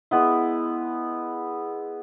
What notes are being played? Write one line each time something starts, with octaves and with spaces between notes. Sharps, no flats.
G#3 B3 E4